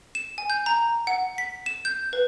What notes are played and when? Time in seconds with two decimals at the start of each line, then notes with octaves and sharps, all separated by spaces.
0.15 E7
0.38 G#5
0.50 G6
0.66 A#5
1.07 F#5
1.38 B6
1.66 E7
1.85 G6
2.13 B4